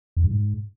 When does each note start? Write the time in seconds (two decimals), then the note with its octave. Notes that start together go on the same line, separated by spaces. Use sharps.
0.17 F2
0.24 G2
0.31 G#2